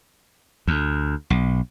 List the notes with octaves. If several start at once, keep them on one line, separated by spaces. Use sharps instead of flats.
D2
B1